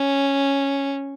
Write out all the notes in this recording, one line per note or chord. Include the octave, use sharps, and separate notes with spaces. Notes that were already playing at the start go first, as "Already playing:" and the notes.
Already playing: C#4